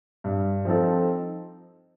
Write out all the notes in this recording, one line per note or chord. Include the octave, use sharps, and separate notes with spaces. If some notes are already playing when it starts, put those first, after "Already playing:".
G2
F3 C4 D#4 A4